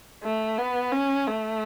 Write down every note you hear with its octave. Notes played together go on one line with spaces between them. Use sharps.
A3
B3
C#4
A3